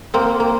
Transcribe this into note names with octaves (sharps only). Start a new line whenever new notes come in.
A#3 C4
A#3